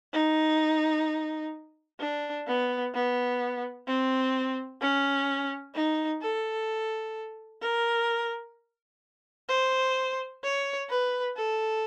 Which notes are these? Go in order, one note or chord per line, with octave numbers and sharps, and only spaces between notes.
D#4
D4
B3
B3
C4
C#4
D#4
A4
A#4
C5
C#5
B4
A4